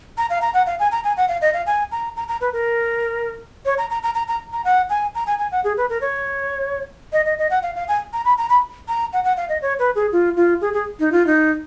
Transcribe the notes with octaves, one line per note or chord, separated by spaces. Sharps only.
A#5
F5
A#5
F#5
F5
G#5
A#5
G#5
F#5
F5
D#5
F5
G#5
A#5
A#5
A#5
B4
A#4
C#5
A#5
A#5
A#5
A#5
A#5
A#5
F#5
G#5
A#5
G#5
G#5
F#5
G#4
B4
A#4
C#5
D#5
D#5
D#5
F#5
F5
F5
G#5
A#5
B5
A#5
B5
A#5
F#5
F#5
F5
D#5
C#5
B4
G#4
F4
F4
G#4
G#4
D#4
F4
D#4